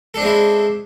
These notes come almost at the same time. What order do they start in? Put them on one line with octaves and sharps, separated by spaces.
A4 D4 C4 G#3 E4